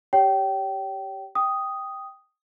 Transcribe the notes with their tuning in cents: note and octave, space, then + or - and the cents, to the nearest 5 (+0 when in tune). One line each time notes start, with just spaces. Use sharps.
G4 +0 C#5 +25 G5 -25
G5 +0 D#6 +0